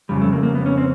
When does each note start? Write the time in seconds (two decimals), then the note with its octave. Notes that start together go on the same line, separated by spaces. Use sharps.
0.09 F2 C#3 G3
0.21 A3
0.33 A#3
0.43 A#3
0.55 B3
0.66 C#4
0.78 C4